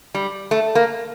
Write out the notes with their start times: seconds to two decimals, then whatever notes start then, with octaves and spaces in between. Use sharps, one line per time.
0.15 G3
0.51 A3
0.75 A#3